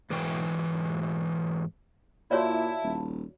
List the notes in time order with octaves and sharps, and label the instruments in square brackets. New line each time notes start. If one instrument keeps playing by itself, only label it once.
[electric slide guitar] G#2 E3 F#3 G5
[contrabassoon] A#2 [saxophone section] E4 [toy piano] F#4 C#5 D5 [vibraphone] F5 A5 B5
[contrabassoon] D#1